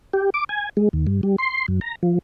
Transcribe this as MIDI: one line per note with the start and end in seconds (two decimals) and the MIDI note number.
0.13 0.30 67
0.34 0.44 86
0.49 0.69 80
0.77 0.89 56
0.93 1.06 39
1.07 1.21 43
1.23 1.36 55
1.38 1.66 84
1.68 1.80 42
1.81 1.95 82
2.03 2.19 53